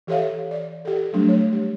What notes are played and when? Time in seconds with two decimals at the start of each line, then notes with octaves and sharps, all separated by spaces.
0.07 E3 G4 A4 C#5 E5 F5
0.51 D5
0.85 G4 A4
1.13 F#3 G3 A3 D4
1.29 C#5
1.52 G4